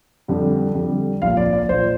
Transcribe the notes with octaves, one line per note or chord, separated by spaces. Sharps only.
F2 D3 G3
F2 D3 G3
A#1 A#2 F3 F5
D5
D5
A#1 A#2 F3 C5